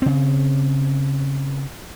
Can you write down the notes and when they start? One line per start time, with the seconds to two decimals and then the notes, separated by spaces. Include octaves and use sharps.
0.02 C#3 C4